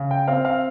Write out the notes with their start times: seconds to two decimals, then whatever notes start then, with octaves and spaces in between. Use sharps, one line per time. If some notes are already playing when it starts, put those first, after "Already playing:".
Already playing: C#3
0.11 G5
0.28 C4 F5
0.45 F5